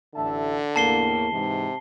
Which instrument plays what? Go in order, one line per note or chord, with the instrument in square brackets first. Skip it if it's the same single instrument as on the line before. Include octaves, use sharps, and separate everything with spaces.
[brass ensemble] A1 E5 A5 [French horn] D3
[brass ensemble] E2 A2 A#3 [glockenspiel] A5 C7 G7
[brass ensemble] G#2 E3 [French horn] C3